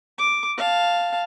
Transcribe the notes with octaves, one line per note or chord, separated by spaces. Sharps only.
D6
F5 A5